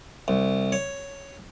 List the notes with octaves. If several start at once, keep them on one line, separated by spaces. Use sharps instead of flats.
C2
C#5